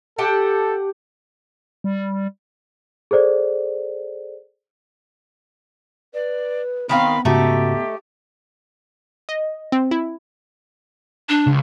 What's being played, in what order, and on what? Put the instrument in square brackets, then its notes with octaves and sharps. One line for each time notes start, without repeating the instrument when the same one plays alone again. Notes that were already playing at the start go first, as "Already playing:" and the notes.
[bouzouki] G4 F#5 A5 [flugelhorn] A4
[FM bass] G3
[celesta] G#4 A4 C5 D5
[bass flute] B4 [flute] D5
[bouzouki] D#3 C4 F5 [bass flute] B3 [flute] B5
[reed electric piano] G#2 C#3 F#4 [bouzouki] A3 D#4 A4 [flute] G4
[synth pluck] D#5
C4
E4
[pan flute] D4
[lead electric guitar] C#2